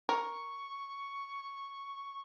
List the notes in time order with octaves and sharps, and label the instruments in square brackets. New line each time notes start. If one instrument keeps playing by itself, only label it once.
[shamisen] A#4 [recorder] C#6